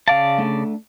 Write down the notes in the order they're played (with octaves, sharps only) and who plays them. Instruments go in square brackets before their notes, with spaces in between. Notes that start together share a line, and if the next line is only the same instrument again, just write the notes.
[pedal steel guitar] C#3 D5 A5 [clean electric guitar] F5
[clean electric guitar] A3 D4